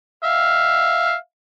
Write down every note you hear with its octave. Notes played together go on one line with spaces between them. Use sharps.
E5 F5